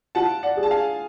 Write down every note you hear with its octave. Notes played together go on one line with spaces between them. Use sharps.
F4 F#5 A5
D5 F#5
G#4
A5
F5 G#5